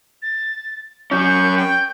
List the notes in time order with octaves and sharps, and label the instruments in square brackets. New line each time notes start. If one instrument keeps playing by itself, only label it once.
[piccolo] A6
[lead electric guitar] F#3 C#4 [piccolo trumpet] C#6 [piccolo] G6
[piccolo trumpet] G5 [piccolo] G6